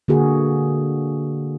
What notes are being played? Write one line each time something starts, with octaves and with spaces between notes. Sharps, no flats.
D3 A#3 F#4 G#4